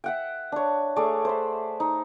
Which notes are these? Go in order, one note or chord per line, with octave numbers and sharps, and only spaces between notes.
E5 F#5 G5
D4 C#5
A3 G#4 C#5 D5
C5 B5
D#4